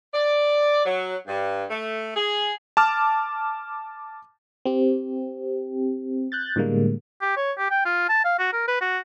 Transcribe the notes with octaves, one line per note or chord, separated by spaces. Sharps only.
D5
F#3
G2
A3
G#4
A5 D6 F6
C4 G4
F#6 G6 A6
A2 D3 G3 G#3 A#3
G4
C#5
G4
G5
F4
A5
F5
F#4
A#4
B4
F#4